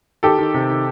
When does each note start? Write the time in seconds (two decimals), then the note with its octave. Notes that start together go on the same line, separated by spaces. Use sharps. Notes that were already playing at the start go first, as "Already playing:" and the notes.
0.23 D#3 G4 A4
0.39 D#3
0.54 C3
0.70 D#3